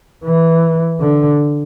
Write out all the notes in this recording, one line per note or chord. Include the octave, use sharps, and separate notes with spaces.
E3
D3